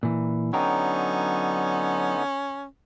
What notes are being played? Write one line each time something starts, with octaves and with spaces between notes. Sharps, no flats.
A#2 E3
D3 F#3 B3 C#4 D#4 G5 A#5